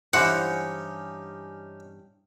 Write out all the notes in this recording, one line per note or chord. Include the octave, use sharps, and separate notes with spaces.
G2 E3 C#4 D#4 G4 C5 F#5